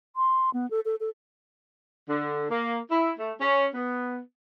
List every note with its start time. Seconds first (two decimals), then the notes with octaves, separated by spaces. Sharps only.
0.16 C6
0.54 B3
0.71 A4
0.85 A4
1.00 A4
2.09 D3
2.50 A#3
2.91 E4
3.18 A3
3.40 C#4
3.74 B3